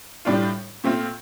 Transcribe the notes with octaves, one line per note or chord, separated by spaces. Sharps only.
A2 G3 D4 F4
A#2 A3 C4 F4